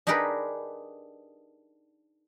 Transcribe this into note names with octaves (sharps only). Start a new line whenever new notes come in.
D4 D#4 G4 G#4 A#4 B4